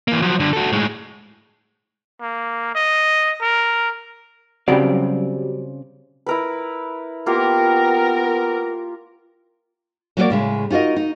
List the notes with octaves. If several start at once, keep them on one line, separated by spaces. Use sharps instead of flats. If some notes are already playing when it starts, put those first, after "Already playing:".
E3 A#3
F3 F#3
G2 D3
F#4 A4
A2 G#3
A#3
D#5
A#4
C#3 F#3 G3 C4 D5
E4 A#4 B4
A#3 B3 F4 G4 A#4
F#3 A#3 F#4 G4 A#4 D5
A2 C#3 G#3
D#4 F4 F#4 A#4 D#5
D#4